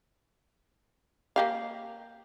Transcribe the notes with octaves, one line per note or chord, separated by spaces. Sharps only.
A#3 G4 F5